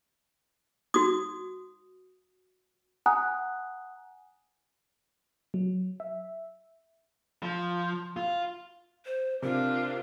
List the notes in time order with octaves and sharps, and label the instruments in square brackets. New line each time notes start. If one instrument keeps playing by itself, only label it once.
[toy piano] F#4 D#6
[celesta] F#5 G#5 A#5 D#6 F#6
[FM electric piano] F#3
E5
[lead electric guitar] F3
F4
[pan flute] C5
[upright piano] C3 [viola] D4 F4 [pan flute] A#4